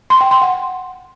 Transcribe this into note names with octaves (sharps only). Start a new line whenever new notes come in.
C6
G5
C6
F#5